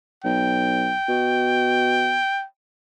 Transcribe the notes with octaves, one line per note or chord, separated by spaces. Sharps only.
B1 G5
B2